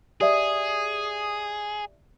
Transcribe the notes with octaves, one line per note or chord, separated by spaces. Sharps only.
G4 G#4 D5 E5 D#6